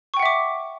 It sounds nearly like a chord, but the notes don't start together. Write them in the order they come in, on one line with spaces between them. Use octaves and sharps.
C#6 G5 F#5 E5 D6